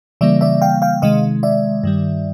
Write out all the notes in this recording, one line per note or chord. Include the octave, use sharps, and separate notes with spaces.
C#3 E3 G3 A#3 D5 E5
D5 E5
F5 G5
F5 G5
C3 D#3 G#3 D#5 F5
D5 E5
G2 D#3 G3